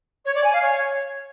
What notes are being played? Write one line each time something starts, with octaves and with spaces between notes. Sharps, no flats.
C#5
D5
G#5
F5
C#5